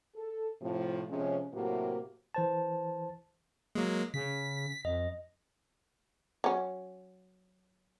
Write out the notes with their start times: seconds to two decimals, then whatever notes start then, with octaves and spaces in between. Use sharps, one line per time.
0.16 A4
0.61 A2 C3 F3
1.10 C3 F3 G#3 C#4
1.53 A2 C3 F#3 A#3 F#4 G4
2.34 E3 C5 A5
3.75 F#3 G#3 A#3
4.14 C#3 B6
4.85 F2 D#5
6.44 F#3 C#4